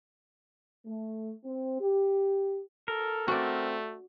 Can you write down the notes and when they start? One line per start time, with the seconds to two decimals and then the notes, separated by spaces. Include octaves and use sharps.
0.86 A3
1.45 C4
1.80 G4
2.88 A4 A#4
3.28 A3 C4 F#4 D5